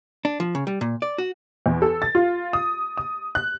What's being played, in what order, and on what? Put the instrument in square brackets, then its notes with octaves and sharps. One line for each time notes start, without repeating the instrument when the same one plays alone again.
[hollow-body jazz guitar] D4
F3
C#3
G3
A#2
D5
F#4
[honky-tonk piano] E2
A4
A6
F4
D#6
D#6
F#6